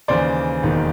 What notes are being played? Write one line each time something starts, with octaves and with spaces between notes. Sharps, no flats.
D#2 C#3 E3 C5 D5
E1 D#2 D#3